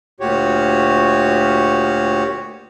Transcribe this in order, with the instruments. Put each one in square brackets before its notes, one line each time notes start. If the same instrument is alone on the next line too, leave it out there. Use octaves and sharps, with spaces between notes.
[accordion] D2 A#2 F#4 G4 C#5